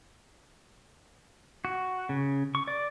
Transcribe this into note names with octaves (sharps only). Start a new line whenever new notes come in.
F#4
C#3
C#6
D5